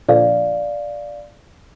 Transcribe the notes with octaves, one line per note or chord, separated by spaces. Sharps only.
A#2 D3 F3 D5 F5